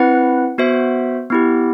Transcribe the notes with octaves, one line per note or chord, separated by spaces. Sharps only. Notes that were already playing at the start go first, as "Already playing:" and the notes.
Already playing: C4 E4 B4 F#5
B3 F#4 C5 E5
B3 E4 G4